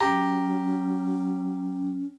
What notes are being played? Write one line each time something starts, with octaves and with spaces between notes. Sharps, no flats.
F#3 C#4 G4 A#5